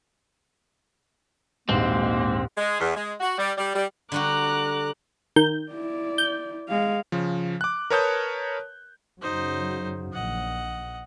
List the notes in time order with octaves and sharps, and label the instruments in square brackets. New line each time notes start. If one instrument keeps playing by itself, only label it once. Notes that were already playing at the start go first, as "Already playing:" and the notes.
[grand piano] D#1 A#1 F#7 [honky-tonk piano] G#2 [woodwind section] B2 A#3 [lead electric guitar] C4
[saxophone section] G#3
E2
G#3
F#4
G3
G3
G3
[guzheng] D3 G3 F#4 [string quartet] A#5 D6 F#6
[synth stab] D#3 G6
[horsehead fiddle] E4 D5
[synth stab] G6
[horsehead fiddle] G#3 F5
[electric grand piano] C#3 F3
D6 F#6
A#4 B4 C#5 A5 D#6 G6
[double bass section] F#2 C#3 F#3 [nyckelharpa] D#4 C5
[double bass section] A#1 [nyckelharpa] D#5 F#5